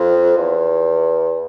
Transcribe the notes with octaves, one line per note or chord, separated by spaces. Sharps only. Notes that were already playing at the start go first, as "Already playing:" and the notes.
Already playing: F2
E2